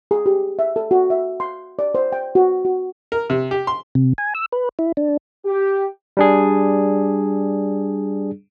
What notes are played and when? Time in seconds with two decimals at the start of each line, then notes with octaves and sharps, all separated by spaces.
0.11 G#4
0.26 G4
0.59 E5
0.76 A4
0.91 F#4
1.10 E5
1.40 C6
1.79 D5
1.95 C5
2.12 G5
2.35 F#4
2.65 F#4
3.12 A#4
3.30 C3
3.51 G4
3.67 C6
3.95 C3
4.18 G#5
4.35 E6
4.52 B4
4.79 E4
4.97 D4
5.46 G4
6.17 G3 D4 G#4